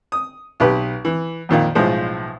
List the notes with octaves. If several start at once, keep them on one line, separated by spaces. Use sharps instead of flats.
D#6
B1 G4 B4
E3
F2 A#2 D#3 F5
B1 A2 F3 G#3 F4 C5